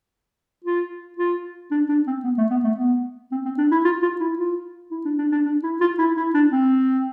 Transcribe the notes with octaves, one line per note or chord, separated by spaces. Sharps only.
F4
F4
D4
D4
C4
B3
A3
B3
A3
B3
C4
C4
D4
E4
F4
F4
E4
F4
E4
D4
D4
D4
D4
E4
F4
E4
E4
D4
C4